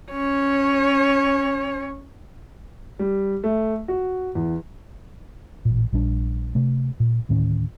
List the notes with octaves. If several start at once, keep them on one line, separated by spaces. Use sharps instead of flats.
C#4 C#5
G3
A3
F#4
E2
A1 A#2
A#1 G3 D4
C3 A3
A#2
D2 A2 D#3 C#4